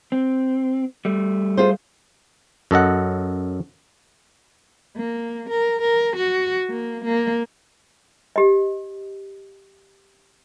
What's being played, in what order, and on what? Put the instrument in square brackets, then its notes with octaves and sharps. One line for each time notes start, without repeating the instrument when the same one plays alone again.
[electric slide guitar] C4
G3 A3
[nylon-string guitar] F4 G#4 C5
[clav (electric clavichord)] F#2 A4 D#5 F#5
[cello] A#3
A#4
A#4
F#4
A#3
A#3
[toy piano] G4 D#5